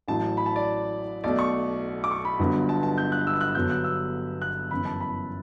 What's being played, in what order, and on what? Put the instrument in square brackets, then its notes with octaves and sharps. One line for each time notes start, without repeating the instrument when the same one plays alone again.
[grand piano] A1 A2 F#3 A5
B5
A5
D5
B1 B2 A3 D5
C#6
D6
C#6
B5
G1 G2 D3 F#3 B3
A5
A5
G6
F#6
E6
F#6
G1 G2 D3 F#3 B3 G6
F#6
E6
F#6
G1 F#2 E3 B3 B5
A5
B5